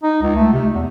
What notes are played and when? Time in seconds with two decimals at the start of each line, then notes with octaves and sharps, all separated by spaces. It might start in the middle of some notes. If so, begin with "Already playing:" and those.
0.03 D#4
0.22 C#2
0.35 A3
0.53 C3
0.74 E2